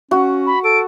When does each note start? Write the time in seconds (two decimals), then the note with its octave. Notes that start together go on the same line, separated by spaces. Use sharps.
0.11 C#4 F#4
0.47 B5
0.64 A4 D7